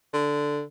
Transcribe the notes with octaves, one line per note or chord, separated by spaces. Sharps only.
D3